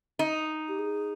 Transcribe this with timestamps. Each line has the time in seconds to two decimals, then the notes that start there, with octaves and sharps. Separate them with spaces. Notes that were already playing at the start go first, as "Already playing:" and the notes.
0.19 D#4
0.69 G4
0.79 G#4